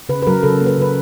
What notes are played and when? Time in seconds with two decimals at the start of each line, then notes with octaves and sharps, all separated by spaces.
0.09 C#3 B4
0.22 B4
0.27 F#3 A#4
0.43 C#3 A4
0.61 A#3
0.66 B4
0.78 C#3 B4